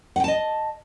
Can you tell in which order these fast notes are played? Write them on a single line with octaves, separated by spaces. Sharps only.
F#5 G5 A5 D#5